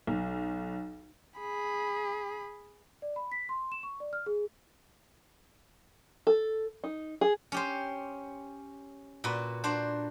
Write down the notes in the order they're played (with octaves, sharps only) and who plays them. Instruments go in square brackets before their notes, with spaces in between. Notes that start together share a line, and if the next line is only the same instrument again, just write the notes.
[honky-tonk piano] B1
[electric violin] G#4 B5
[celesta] D5
B5
B6
C6
E7
C#6
D5
F6
G#4
[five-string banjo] A4
D#4
G#4
[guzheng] C#4 G4 C5
A#2 F#4 B4
D4 F#4 C5